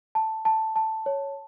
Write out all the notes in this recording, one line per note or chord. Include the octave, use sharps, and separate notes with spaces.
A5
A5
A5
C#5